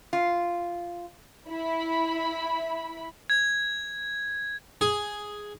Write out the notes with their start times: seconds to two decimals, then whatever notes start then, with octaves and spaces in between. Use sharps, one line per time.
0.13 F4
1.48 E4 B5
3.30 G#6
4.81 G#4